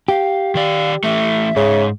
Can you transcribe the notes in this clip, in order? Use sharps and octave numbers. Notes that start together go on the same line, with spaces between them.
G4 F5
D#3 D5 F5
E3 A3 E5
G#2 C#3